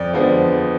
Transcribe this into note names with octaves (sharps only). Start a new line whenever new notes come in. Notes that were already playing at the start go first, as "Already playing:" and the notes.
Already playing: F2 D5
D3 F3 G#3 B3